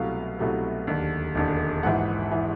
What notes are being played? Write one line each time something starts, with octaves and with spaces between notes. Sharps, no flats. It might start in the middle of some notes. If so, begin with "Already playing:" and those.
Already playing: C2 B2 F#3 A3 F5
C2 B2 F#3 A3
E1 D#2 D3
E1 D#2 D3
A#1 G#2 E3 F#5
E3